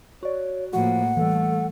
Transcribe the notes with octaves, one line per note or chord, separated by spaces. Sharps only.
F#4 C#5 D5
A2 F3 A#3 F#4 F#5
E3 G3 A3 A4